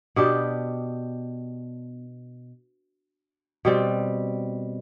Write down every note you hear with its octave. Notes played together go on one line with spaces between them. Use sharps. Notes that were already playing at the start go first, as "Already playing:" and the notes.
B2 B3 D4 G4
B2 G3 C4